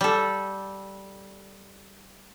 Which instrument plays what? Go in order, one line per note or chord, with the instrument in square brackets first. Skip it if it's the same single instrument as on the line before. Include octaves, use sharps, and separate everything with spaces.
[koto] G3 A4